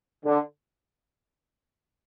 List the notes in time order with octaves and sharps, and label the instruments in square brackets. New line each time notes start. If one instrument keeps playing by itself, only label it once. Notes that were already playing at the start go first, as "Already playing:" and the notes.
[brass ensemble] D3